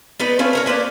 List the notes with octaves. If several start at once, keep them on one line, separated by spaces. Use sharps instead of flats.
B3 D#4 B4 D5
A3 C4 C#4 F4
A#4 C#5 A#5
A#3 B4 C5 D5